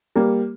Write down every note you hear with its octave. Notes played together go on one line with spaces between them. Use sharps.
G3 A#3